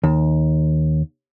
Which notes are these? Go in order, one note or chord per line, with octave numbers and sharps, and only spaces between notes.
D#2